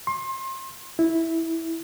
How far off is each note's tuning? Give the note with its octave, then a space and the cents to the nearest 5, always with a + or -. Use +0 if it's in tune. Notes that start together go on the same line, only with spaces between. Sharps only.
C6 +30
E4 -10